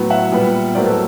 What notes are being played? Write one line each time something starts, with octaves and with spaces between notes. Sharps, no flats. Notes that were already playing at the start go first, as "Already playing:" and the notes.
Already playing: A2 F#3 B3
E5 F#5
A#2 G3 B3
A2 F#3 A#3 C5 D5
A4 B4